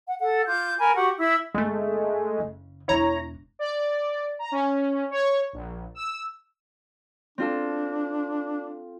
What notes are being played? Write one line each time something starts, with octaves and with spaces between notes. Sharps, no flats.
F#5
A4 F#5
F4 D6 G6
A#4 G#5 B5
F#4 G4 F#5 C#6
E4 E5 E6
G1 G#3 A3
F#1 C#3
E1 D4 E4 C#5 A#5
D5
A#5
C#4
C#5
A#1
E6
C4 D4 F4 A4